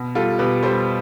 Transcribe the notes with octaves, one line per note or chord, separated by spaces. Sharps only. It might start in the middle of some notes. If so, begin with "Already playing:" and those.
Already playing: B2
G3 F4 A4
B2 G4 B4
G3 A4 C5